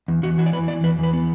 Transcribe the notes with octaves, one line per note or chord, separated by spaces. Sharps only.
E2
E2 F#4
E3 F#4
D5
E3 B4
E2 D5
E2 B4
E2 B4
B3